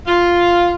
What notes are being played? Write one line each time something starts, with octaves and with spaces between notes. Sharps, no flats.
F4